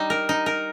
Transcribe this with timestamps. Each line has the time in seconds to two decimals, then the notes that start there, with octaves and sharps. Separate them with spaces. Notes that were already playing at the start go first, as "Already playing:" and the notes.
Already playing: G3 D#4
0.10 A#4
0.29 D#4
0.46 A#4